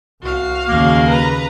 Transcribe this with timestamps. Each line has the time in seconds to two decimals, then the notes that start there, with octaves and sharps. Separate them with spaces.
0.22 C2 F#4 F5
0.68 D#2 C#3 A#3
1.07 B4 A#5